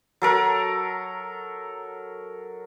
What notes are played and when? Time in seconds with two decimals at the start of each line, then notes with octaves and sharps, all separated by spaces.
0.22 F#3 A4 A#4